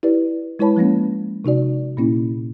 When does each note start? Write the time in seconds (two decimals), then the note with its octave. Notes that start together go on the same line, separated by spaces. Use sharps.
0.03 E4 G4 B4 D5
0.59 G#3 E4 B4 C#5 A5 B5
0.76 F3 G#3 A#3 C#4
1.45 C3 D#4 F#4 D5
1.97 A#2 A#3 C#4 E4